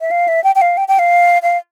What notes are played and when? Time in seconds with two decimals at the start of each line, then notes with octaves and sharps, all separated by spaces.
0.01 E5
0.11 F5
0.28 E5
0.44 G5
0.55 G5
0.61 F5
0.77 G5
0.88 G5
0.99 F5
1.42 F5